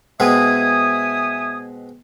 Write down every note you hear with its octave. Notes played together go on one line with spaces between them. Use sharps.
B2 G#3 C4 E5 G#5 D#6